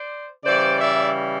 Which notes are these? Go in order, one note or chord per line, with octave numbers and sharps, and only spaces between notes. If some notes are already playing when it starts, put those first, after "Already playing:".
Already playing: C5 D5
C#3 E3 G3 C5 D5
D5 E5